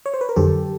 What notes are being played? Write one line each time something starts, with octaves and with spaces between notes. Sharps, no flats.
C#5
C5
B4
A#4
F2 D3 F#3 G4 A4